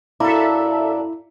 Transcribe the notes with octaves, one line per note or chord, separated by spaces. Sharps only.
F#2 D4 E4 A4 E5 F5 A#5 D6